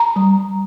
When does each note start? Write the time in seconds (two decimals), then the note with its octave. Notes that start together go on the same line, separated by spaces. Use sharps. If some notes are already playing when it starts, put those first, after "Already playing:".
Already playing: A#5
0.16 G3